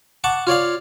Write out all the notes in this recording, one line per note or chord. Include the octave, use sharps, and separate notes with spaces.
F#5 A5 C#6 D6
F4 C#5 D5 F5